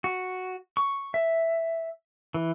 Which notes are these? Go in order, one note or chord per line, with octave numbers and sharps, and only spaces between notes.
F#4
C#6
E5
E3